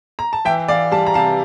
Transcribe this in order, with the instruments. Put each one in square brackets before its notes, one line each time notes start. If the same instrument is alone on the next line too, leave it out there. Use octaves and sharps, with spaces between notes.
[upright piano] A#5
A5
E3 E5 G5
E3 D5 F5
G3 F5 A5
A#5
C3 F5 A5